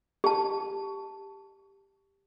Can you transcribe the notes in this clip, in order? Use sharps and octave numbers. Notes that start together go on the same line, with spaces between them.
G4 A5